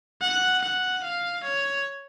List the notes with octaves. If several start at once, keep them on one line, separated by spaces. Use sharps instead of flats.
F#5
F#5
F5
C#5